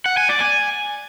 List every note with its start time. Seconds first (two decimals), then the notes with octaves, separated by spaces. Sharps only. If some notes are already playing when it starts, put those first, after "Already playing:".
0.06 F#5
0.17 G#5
0.29 D5
0.40 G#5